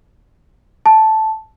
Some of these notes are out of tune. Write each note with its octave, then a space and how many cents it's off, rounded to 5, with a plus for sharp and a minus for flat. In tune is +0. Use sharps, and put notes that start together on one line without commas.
A5 -5